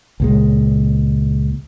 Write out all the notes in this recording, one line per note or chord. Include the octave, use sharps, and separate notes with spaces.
C#2 A#2 G#3